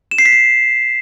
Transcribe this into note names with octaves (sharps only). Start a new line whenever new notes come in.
E7
C7
B6
C7